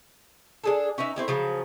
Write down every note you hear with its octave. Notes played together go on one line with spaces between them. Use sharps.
D4 G#4 A4
C#4 D#4 B4 E5
A3 C4 E4 G4
C#3 F3 F#3